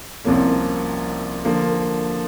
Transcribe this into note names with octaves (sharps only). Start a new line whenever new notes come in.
C2 C3 F3 A#3 C#4
D3 F3 A#3